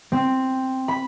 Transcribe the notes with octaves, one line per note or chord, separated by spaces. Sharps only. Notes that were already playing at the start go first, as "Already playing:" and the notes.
C4
B5